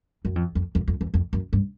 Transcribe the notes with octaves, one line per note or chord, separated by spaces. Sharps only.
F#2
F2
F2
F2
F2
E2
F2
F#2
G2